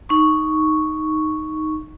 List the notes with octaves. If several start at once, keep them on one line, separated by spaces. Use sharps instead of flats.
D#4 C#6